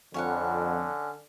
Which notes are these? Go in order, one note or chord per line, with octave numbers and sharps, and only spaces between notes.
F2 D3 C#4 C#5 F5 F#5